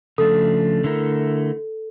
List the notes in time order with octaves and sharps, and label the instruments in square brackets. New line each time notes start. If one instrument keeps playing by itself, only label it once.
[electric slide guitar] C#3 F3 A3 D4 [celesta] A4
[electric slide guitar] D3 A3 E4 A#4